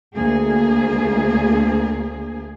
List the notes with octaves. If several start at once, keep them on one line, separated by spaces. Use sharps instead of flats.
D2 A#3 G#4